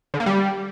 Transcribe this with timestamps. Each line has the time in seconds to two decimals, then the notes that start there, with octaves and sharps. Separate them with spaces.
0.14 D3
0.20 A#3
0.26 G3